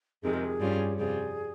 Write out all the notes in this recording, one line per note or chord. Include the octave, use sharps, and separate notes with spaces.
F2 C3 D#3 G#3 G#4
A#4
G#4
G2 G3 C#4 F4
F2 C3 G3 C4 F4 G#4